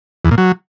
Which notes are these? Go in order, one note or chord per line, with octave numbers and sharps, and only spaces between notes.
E2
A#2
F#3